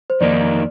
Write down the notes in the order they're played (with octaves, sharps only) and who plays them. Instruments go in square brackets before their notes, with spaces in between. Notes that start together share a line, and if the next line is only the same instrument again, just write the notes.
[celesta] C5
[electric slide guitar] F2 D#3 A#3 D#4 [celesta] D5